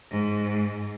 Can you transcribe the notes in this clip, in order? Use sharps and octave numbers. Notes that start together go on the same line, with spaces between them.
G#2